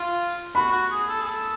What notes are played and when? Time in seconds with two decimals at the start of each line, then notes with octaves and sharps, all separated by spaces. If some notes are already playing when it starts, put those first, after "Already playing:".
Already playing: F4
0.55 F#4 B5
0.72 F#4
0.91 G#4
1.09 A4
1.21 G#4
1.28 A4